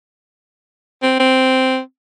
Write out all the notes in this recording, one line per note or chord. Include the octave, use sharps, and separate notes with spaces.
C4
C4